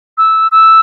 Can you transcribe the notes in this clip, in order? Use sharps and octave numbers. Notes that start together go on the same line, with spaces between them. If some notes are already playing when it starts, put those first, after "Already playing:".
E6
E6